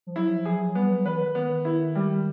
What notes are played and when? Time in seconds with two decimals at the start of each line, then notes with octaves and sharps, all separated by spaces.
0.07 F3
0.16 F#3 E4
0.36 F3
0.45 G#4
0.56 F#3
0.75 G3 B3
0.90 F#3
1.05 E3 B4
1.20 D#3
1.35 B3
1.65 E4
1.95 G3